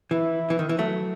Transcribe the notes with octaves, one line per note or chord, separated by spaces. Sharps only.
E3 E4
E3
D#3
E3
F#3 A3